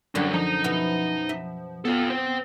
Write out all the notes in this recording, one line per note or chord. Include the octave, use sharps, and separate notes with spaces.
F#2 D3 G3 C#4
F3 D#4 A#5
B2 B3 E4
E5
B3 F4 A4
C4 C5